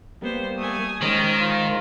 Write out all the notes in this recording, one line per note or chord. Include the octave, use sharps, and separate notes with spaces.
G3 A#3 B3 C5
A3 G#5 D#6
D#3 G#3 C#4 C5 D#5
F4